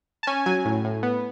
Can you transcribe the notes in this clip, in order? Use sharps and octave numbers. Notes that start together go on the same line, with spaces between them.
A5
C#4 G#5
F#3 G#5
A2
A2
B3